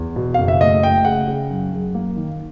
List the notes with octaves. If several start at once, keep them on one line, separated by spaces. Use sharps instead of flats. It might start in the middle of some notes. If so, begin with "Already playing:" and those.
Already playing: E2
B2
F#1 F5
E5
A3 D#5
A3 G5
C#3 F#5
C#3
F#2
F#2
A#3
D#3